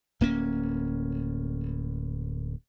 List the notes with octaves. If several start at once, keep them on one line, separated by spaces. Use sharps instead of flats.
D1 A#3 C#4